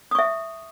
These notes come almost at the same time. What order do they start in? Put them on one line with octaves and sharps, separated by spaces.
D#6 C#6 E5